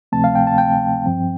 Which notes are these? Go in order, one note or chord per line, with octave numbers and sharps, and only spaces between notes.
D2 C3 F3 A3 C4 A5
F5
G5
A5
G5
G2 F3 C4